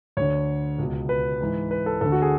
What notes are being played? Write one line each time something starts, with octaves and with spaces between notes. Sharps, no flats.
D2 D3 C#5
C#2 B2
B4
G#2 E3
B4
A4
D2 D3 A4
F#4
G#4